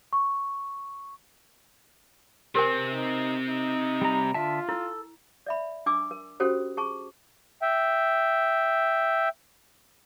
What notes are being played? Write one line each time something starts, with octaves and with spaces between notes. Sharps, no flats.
C#6
C3 C4 G4 A#4 G#5
D#4
D#4
G3 A#5
D3 F4 E5 A5
E4 A4
D5 E5 B5
D4 G#5 D6 E6
A#4
C#4 F#4 G4 A4 C5
G#4 A5 C#6
E5 G5